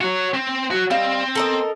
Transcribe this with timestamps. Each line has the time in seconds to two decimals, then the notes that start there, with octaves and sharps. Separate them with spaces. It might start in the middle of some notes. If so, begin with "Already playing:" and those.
0.01 F#4 C#5
0.34 C4
0.71 F#3 F#4
0.91 G3 C4 D#5 F5
1.35 A4 A#4 D#5